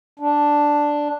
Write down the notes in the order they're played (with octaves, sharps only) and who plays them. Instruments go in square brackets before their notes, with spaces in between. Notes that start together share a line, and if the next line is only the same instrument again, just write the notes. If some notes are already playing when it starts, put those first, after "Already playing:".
[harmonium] D4